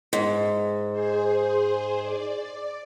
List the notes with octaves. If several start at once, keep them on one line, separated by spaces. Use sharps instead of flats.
G#2
G#4 C5
D5